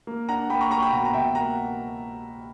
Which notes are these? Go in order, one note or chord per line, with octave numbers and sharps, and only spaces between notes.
A#3
D4 F#5 A#5
A#3 G5 B5
A#5 C#6
A#3 A#5 C#6
G5 B5
B2 F#5 A#5
A#5
B2 E5 G5
A#3 F#5 A#5